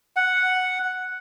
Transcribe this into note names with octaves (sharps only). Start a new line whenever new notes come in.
F#5